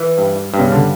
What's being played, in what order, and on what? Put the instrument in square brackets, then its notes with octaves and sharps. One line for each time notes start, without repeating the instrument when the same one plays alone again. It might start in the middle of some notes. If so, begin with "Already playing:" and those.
Already playing: [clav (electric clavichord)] E3
G2
G2
[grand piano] C#3
D3